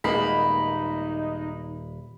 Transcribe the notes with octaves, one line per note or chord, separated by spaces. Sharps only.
D#1 G#3 A#3 B3 D#4 B5